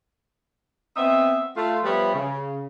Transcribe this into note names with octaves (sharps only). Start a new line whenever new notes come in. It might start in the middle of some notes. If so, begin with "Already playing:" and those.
B3 C4 D#5 E5
A3 F4
F3 G3 B3 B4 C#5 E5
C#3